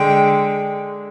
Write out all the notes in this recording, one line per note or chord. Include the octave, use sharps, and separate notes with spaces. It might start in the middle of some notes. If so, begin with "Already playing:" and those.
Already playing: D3 G#3 G5